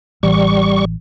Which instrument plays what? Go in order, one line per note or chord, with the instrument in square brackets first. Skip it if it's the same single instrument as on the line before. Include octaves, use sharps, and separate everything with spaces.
[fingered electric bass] A1 E3 [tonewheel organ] G3 C#6